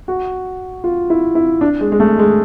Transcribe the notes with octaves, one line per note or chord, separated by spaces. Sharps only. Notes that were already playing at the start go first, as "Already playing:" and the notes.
F#4
F4
E4
E4
D4
G#3
G#3
A3
G#3